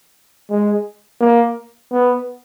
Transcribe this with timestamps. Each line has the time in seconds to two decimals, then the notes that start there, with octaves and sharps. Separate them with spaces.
0.50 G#3
1.21 A#3
1.92 B3